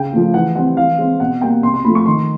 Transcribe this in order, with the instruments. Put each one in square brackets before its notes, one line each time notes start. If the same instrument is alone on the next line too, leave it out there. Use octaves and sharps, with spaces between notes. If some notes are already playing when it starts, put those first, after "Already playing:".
Already playing: [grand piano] C#3 G5
F3 A3
E3 F#5
G3 C4 F#5
E3 F5
G#3 C4
B2 F#5
G3 A#3 G5
C3 C6
C6
F3 A3 B5
C#6
D#3 C6